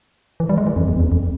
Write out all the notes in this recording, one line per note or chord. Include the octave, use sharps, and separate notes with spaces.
E3
G3
G#3
E3
F2
E2
E2
F2